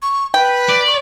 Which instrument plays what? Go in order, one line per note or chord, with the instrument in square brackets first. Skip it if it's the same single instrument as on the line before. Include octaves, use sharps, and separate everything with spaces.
[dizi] C#6
[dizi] B4 [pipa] G5
[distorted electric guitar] D5
[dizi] C#6